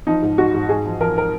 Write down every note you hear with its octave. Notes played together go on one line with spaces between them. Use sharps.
F3 D#4
G#2
G#2 F#4
G#2
G#2 G#4
F3
F3 A#4
A#4